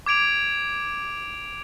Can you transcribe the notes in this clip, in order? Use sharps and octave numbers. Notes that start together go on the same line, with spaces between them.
D6 G#6 D7 F7